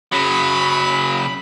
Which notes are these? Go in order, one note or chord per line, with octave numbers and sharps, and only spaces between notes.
C#3 F#3 B5